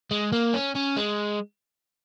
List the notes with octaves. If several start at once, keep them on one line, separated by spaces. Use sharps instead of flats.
G#3
A#3
C#4
C#4
G#3